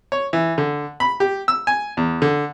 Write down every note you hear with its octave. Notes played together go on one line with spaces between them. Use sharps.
C#5
E3
D3
B5
G4
E6
G#5
E2
D3